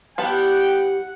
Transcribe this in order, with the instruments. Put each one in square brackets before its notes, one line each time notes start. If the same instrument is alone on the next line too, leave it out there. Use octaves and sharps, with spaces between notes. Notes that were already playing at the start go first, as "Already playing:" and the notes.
[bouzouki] G3 E4 G4 [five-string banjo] B3 B4 A5 [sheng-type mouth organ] F#5 [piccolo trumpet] G5